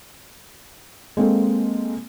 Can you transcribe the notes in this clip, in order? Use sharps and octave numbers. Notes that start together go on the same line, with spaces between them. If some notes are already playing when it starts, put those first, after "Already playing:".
G#3 A#3 C4 A4